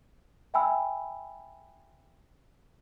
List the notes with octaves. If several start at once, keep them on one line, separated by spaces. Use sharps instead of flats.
E5 G5 G#5 B5 E6